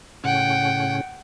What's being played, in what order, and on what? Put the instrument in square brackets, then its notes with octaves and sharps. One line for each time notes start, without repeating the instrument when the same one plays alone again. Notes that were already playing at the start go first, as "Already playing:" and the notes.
[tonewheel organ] A2 C#3 C#4 [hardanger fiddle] F#5 G5